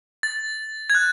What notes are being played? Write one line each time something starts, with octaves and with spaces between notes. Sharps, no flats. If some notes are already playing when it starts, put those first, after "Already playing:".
A6
G#6
F#6